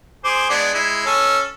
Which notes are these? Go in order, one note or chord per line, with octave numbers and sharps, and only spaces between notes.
G#4 C5 D6
G#3 B3 D4
G#3 E4
C#4 A4